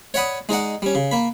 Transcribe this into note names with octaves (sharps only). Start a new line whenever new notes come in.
C#5 D5 F#5 B5 D#6
G#3 D#4 D5 F#5
G3 C#4
C#3
A#3 B5